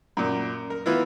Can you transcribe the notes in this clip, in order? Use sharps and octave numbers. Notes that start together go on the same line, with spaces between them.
F#2 A#2
A#4
E3 B3 E4 F4